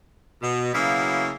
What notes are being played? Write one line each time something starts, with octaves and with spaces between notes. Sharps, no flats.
B2
C#3 F#3 A#3 B3 E4